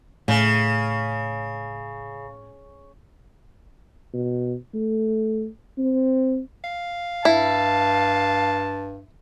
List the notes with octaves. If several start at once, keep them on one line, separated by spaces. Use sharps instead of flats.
A2 C#3
B2
A3
C4
F5
G2 E4 A5